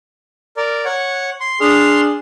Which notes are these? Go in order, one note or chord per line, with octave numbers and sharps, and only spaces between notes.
A#4 D5
C#5 F#5
C6
D4 G#4 C6 F6